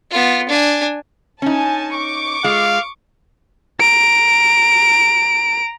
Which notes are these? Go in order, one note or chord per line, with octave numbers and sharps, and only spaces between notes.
B3 F4
D4 G#5
C#4 D#4 G#5 A5
C#6 D6
G#3 F4 F5
A#5 D7